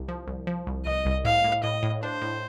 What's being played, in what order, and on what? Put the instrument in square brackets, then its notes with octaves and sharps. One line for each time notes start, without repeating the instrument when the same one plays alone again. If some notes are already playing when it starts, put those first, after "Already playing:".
Already playing: [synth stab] C2 C3
F3
C2
F3
C2
[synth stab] C2 [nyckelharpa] D#5
[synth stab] C2
[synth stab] A2 [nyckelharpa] F5
[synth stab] A2
[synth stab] A2 [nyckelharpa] D#5
[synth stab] A2
[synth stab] D4 [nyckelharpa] C5
[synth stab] A2